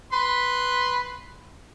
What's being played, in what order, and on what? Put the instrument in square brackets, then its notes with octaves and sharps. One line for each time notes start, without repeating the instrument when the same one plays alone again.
[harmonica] B4 C6